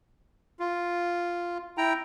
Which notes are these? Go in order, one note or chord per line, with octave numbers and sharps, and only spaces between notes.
F4
E4 G5 A#5